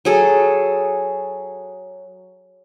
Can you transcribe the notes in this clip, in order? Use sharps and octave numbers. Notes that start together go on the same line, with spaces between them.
F#3 G#4 A4